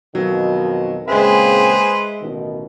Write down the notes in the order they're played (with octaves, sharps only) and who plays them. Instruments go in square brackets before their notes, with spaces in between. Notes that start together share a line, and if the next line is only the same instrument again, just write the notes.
[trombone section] F2 B2 D#3 [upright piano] F#3
[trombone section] A#2 C#3 C4 [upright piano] G#3 E5 [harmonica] G#4 B4 C5
[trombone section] A1 B2 D#3